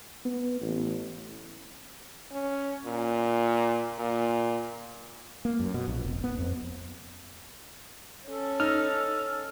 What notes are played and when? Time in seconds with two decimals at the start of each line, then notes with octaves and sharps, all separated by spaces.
0.25 B3
0.61 A1
2.32 C#4
2.85 A#2
3.99 A#2
5.45 A#3
5.60 F#2
5.74 B2
5.88 A#1
6.04 F1
6.24 B3
6.38 F2
8.28 C#4 A4
8.60 D#4 F6